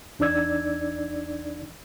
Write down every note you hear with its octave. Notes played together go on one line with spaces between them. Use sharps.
E2 D4 D#4 D5 E6 G#6